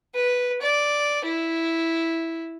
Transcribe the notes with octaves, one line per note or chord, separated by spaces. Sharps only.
B4
D5
E4